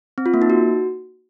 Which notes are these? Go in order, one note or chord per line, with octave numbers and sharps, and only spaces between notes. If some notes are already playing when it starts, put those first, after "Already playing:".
C4
F4
A#3
D#4
F#4